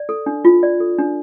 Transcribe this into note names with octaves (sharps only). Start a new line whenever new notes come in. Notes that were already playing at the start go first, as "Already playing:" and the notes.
Already playing: D5
A4
D4
F4
D5
A4
D4